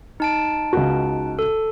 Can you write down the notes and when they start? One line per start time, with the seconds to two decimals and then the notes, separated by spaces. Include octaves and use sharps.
0.20 D#4 A5 D7
0.73 C#2 F#4
1.39 A4